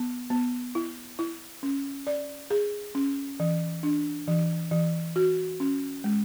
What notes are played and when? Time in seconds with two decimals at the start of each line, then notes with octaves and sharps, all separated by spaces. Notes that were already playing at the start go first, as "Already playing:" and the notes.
Already playing: B3
0.30 B3
0.75 E4
1.19 E4
1.63 C#4
2.07 D5
2.51 G#4
2.95 C#4
3.40 E3
3.83 D4
4.28 E3
4.71 E3
5.16 F#4
5.60 C#4
6.04 G#3